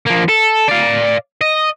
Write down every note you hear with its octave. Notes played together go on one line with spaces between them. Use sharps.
F3 A#3
A4
D5 F5
D#5